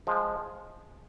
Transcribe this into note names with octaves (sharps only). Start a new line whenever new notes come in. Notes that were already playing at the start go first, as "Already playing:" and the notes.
F3 G#3